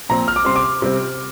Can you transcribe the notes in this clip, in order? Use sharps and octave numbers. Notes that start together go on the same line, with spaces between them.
A#2 F3 C4 A#5
F6
D6
C3 G3 C4 C6
D6
C3 G3 C4